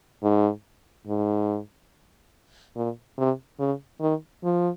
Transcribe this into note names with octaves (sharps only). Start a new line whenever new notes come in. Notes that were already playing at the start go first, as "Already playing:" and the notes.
G#2
G#2
A#2
C3
C#3
D#3
F3